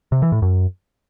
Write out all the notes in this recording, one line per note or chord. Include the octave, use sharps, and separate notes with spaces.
C3
E3
A2
F#2